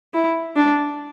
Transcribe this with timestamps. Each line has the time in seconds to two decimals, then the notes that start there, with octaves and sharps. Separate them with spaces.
0.14 E4
0.56 D4